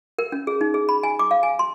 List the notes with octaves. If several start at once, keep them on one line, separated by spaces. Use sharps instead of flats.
A#4
C#4
G#4
D#4
G#4
B5
G#5
D6
F5
G#5
C6